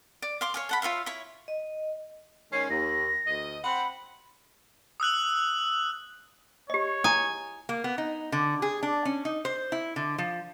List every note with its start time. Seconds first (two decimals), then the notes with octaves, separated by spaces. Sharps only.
0.22 D5
0.41 F5 C6 D6
0.54 C#5 F5 G#5
0.69 A4 F#5 B5
0.82 F4 C#5 E5 F5
1.06 E4 C#5
1.48 D#5
2.53 D#3 G#3 C#4 C7
2.70 D#2 A#6
3.27 D2 D#5
3.64 C4 F#5 B5
5.00 D#6 E6 F#6 F#7
6.70 G4 C#5 D#5
7.04 E4 G#5 D#6
7.69 A#3
7.84 B3
7.98 D#4
8.32 D3
8.62 G#4
8.83 D4
9.05 C#4
9.25 D#4
9.45 C5
9.72 E4
9.96 D3
10.18 F3